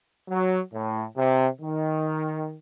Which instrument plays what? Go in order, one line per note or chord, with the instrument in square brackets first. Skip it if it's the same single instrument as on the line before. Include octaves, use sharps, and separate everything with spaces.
[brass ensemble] F#3
A2
C3
D#3